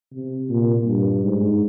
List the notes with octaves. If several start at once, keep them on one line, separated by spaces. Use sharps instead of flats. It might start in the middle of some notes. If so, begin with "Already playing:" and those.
C3
A#2
G2
G#2